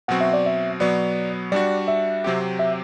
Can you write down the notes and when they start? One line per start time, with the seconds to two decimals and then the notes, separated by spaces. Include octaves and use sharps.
0.08 B2 F#3 C4 F#4 F#5
0.21 E5
0.33 D5
0.46 E5
0.80 B2 F#3 B3 D5
1.52 G3 D4 F#4 D5
1.88 E5
2.24 C3 F#3 C4 G4
2.59 E5